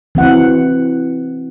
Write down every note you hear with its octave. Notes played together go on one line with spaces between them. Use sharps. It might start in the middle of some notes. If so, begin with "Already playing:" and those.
E3 C4 F#5